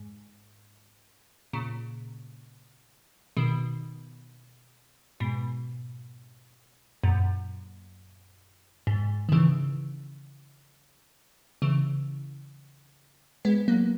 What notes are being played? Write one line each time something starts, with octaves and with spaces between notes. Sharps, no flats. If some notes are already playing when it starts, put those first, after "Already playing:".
Already playing: G#2
A#2 C#3
B2 D#3
G#2 B2
F#2 A#2
G#2
D#3
C#3 E3
C#3 E3
G#3 B3
F#3 A#3